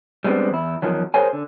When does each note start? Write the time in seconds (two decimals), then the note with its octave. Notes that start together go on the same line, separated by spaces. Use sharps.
0.24 G3 G#3 B3 C4 D4
0.51 E2 E4
0.82 E2 D#3 F3 F#3
1.14 G#4 A#4 C5 C#5 G#5
1.33 D3